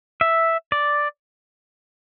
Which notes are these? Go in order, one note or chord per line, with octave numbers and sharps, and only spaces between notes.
E5
D5